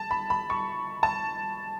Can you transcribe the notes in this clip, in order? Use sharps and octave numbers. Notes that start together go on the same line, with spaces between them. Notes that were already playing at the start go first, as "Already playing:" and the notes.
Already playing: A5
B5
B5
C#6
A5